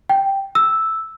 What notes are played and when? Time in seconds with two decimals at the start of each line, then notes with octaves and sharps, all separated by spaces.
0.10 G5
0.55 E6